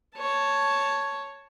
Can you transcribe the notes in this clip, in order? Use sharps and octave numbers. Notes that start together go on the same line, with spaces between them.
C#5 A5